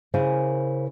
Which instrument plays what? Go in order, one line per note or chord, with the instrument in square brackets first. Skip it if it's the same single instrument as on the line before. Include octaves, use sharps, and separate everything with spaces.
[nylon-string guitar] C#3 E4 A#4 C5 F5 G#5